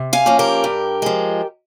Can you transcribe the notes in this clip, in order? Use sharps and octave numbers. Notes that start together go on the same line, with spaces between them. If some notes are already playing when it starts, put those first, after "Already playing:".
Already playing: C3
F5 G#5
F3 A#3 C#4
G4 A#4
G2
F3 G#3